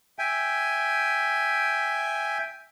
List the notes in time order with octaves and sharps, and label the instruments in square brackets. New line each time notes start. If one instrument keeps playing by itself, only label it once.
[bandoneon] E5 G5 G#5